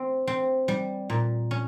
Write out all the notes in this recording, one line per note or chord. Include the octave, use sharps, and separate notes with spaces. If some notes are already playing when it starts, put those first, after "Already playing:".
Already playing: C4
C4
G3
A#2
C#4